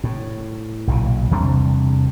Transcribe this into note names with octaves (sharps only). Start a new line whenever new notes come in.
A2
B1 A#2 C#3
E2 C3 G3 D4